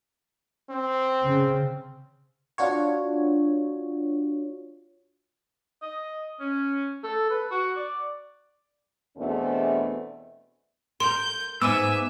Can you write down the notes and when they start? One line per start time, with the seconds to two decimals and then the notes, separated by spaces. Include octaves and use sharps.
0.70 C4
1.23 C#3
2.58 D4 F4 F#4 C#5
5.82 D#5
6.40 C#4
7.04 A4
7.30 B4
7.51 F#4
7.76 D5
9.17 E2 B2 A3 C4 D4 G#4
11.00 A#4 C6 G6
11.62 G#2 B3 E5 G#5 D6 E6